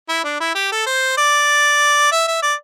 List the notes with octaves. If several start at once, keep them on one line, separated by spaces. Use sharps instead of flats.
E4
D4
E4
G4
A4
C5
D5
E5
E5
D5